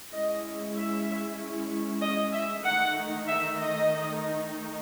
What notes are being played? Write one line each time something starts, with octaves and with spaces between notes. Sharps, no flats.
G#3 C#4 E4 D#5
E5
D#5
E5
D#3 A3 D#4 F#5
E5
D#5